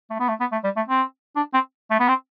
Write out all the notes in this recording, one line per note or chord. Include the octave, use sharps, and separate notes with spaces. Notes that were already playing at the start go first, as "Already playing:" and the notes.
A3
B3
A3
B3
A3
G3
A3
C4
D4
C4
A3
B3
C4